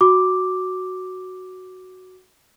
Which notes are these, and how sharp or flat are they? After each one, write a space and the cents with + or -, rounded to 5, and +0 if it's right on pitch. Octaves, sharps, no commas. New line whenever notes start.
F#4 +0 D6 +0